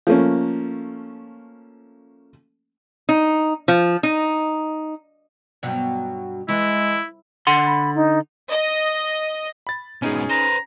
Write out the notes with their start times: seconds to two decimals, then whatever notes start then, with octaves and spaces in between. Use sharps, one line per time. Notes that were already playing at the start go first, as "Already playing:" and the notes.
0.07 F3 A3 A#3 C#4
3.09 D#4
3.68 F3
4.03 D#4
5.63 G2 B2 F#3
6.49 E3 G#3 E4
7.47 D3 F#5 C6
7.66 B5
7.95 D#4
8.50 D#5
9.67 B5 A6
10.02 G#2 B2 C#4 D#4 G#4
10.30 B4 C5 A#5